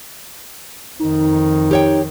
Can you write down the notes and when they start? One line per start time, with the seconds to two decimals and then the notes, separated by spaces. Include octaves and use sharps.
0.99 F2 D#3 D#4
1.71 G4 C#5 G5